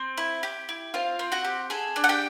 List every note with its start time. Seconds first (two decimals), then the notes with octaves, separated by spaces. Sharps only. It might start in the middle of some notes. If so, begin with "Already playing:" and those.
Already playing: C4
0.18 E4
0.43 G4
0.69 E4
0.94 C4 F4 F5
1.19 C4
1.32 F#4 F#5
1.45 G4
1.70 G#4 A4 G#5
1.96 D4
2.04 F#5
2.09 G4 G5